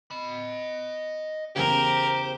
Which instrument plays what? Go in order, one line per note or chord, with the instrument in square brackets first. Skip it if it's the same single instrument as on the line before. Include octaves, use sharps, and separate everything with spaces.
[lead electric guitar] D#5 B5
[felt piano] E2 C#3 [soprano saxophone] G4 [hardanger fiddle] A#4 [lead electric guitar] C5